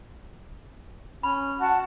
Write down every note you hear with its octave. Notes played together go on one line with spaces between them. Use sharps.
C#4 B5
F#4 F#5 A5